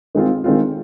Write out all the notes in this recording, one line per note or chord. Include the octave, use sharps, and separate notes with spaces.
D#3 G#3 C4 F4
D#3 G#3 C4 F4